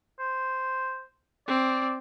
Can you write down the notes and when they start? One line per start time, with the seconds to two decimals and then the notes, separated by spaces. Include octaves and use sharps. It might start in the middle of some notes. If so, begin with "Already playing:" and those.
0.19 C5
1.48 C4 D5